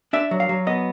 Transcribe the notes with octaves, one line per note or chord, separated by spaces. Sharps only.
D4 E5
F#3
F5
F#3
B3 D#5